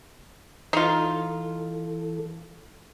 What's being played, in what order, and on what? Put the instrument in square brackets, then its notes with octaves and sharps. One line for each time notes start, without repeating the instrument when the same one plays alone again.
[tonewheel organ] E3 A4 [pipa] D#4 F4